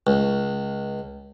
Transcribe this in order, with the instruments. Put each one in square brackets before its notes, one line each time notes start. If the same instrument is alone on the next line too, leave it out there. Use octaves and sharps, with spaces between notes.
[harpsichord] C#2